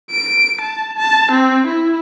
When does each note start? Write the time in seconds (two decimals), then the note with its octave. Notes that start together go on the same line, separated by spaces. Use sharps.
0.11 D7
0.61 A5
0.97 A5
1.32 C4
1.68 E4